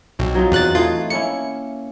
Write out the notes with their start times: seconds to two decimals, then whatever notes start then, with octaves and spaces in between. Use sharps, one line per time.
0.19 B1 C4 F#4
0.35 F#3 D#4 F4
0.52 E2 F#6 A6
0.75 E3 A3 D#4 F4
1.10 A#3 C#4 E4 C#7